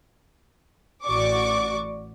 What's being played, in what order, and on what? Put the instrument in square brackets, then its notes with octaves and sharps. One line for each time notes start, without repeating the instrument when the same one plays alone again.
[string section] A1 F#4 D5 C#6 D6